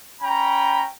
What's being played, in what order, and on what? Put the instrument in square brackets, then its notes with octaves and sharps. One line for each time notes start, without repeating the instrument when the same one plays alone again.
[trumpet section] C#4 G5 A#5 B5